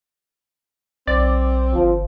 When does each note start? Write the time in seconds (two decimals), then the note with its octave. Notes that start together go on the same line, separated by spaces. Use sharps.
1.08 B1 C4 D5
1.74 G1 F3